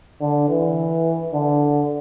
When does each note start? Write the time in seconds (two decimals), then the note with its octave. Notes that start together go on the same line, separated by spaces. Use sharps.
0.21 D3
0.49 E3
1.33 D3